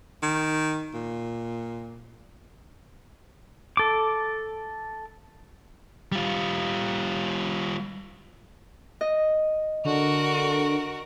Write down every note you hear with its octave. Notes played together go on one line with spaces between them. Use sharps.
D#3
A#2
A4 D6
G3 F4
D#5
D3 F#4 A#4